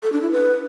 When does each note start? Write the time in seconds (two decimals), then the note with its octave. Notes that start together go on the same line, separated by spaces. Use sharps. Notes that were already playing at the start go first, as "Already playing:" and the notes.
0.03 A4
0.12 D4
0.22 E4
0.32 B4